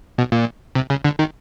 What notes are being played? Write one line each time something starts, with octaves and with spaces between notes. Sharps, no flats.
B2
A#2
C3
C#3
D3
D#3